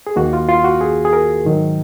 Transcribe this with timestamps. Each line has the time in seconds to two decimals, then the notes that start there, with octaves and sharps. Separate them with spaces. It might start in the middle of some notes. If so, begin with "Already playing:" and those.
0.07 G#4
0.16 D#2 D#3 A#3 F#4
0.33 F4
0.49 F4
0.64 F#4
0.81 G#4
1.05 G#4
1.13 A#4
1.45 G#2 D#3 F#3